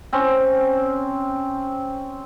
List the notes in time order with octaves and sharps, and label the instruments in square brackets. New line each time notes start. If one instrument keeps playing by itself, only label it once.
[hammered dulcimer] C4 C#4